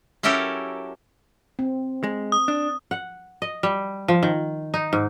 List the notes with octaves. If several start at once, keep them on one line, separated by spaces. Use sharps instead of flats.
F#3 C#4 E4 G4 A4 A#4
C4
G#3
D#6
D4
F#5
D#5
G3
F3
D#3
D#4
G#2